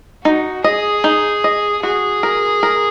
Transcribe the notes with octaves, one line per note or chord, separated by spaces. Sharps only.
D#4 F#4
G#4 D#5
D#4
D#5
F#4 G#4
A#4
A#4